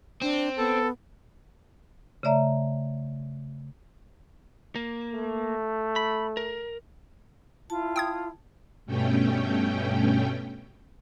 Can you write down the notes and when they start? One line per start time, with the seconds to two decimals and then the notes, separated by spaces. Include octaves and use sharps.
0.22 C4 D4
0.58 B3 A4
2.23 C#3 A3 D5 E5 A#5
4.76 A#3
5.12 A3
5.96 B5
6.37 A#4
7.70 E4 F4 A5
7.96 G5 D#6 G#6
8.86 G2 B2 A3 C#4 G5